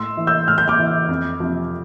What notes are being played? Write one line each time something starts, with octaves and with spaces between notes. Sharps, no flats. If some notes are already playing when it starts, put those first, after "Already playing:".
Already playing: A2 C6 E6
E3
E6 G6
A2 F6
G6
D6 F6
E3
F2
C3 F3